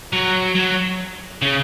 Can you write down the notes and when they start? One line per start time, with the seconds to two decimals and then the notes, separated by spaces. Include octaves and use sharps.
0.13 F#3
0.55 F#3
1.42 C#3